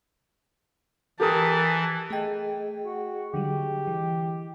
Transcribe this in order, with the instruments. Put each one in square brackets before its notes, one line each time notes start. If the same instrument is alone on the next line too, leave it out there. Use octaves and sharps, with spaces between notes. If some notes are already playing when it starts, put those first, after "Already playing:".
[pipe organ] E3 [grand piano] G4 A#4 D#6 [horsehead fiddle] A5
[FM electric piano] A3 G5 [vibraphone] G#4 D#5
[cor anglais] F#4
[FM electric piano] D3 F#3 G3 [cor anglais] G4
[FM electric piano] E3